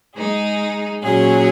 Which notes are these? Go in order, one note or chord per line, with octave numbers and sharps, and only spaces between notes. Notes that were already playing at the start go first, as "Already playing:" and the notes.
G#3 D#4 G#4
A#2 F#3 C#4 G#4